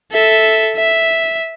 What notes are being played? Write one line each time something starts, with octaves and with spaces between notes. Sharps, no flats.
A4 E5
E5